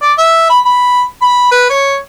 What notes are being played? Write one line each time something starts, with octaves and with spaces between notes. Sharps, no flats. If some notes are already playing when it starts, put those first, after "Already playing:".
D5
E5
B5
B5
B5
B4
C#5